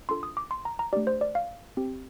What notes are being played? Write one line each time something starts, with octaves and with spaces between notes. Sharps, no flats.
D4 F4 A4 C6
D#6
D6
C6
A#5
A#5
A3 D4 G4 D5
C5
D5
F5
C4 G4